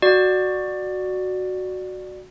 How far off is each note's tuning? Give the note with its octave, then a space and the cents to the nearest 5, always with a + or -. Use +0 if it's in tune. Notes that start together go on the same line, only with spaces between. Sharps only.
F#4 +0 D5 +15